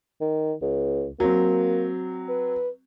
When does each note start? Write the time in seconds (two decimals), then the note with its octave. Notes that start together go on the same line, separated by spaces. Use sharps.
0.21 D#3
0.62 C#2
1.20 F#3 A#3 C4
2.29 B4